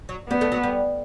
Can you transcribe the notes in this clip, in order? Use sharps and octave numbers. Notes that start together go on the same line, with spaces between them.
F#3
G3 B3
A3
F#3
G3